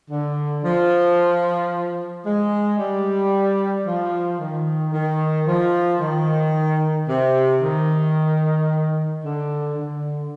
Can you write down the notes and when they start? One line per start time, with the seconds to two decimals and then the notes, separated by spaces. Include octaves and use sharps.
0.10 D3
0.64 F3
2.25 G#3
2.79 G3
3.86 F3
4.39 D#3
4.93 D#3
5.47 F3
6.01 D#3
7.08 C3
7.61 D#3
9.23 D3
9.76 D3